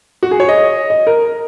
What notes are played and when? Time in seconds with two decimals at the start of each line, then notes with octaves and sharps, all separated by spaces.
0.23 F#4
0.31 G#4
0.40 C#5
0.49 D#5
0.90 D#5
1.07 A#4